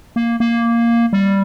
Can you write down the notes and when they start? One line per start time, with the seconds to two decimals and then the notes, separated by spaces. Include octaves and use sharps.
0.16 A#3
0.40 A#3
1.13 G3